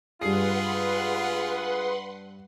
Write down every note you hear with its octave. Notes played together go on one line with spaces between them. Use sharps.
G2 G#3 F4 G#4 B4 F#5 C6 C7